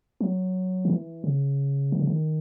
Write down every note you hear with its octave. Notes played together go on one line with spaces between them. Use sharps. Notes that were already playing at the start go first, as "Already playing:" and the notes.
F#3
D#3
E3
C#3
D#3
C#3
D#3